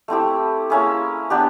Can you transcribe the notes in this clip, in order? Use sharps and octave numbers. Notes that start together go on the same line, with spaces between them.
A3 C4 E4 G4
A#3 C#4 E4 G#4
B3 D4 G4